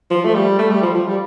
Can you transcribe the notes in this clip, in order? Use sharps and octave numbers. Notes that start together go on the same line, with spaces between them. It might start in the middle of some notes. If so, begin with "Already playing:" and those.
F3
A3
G3
A3
G3
F3
F3
G3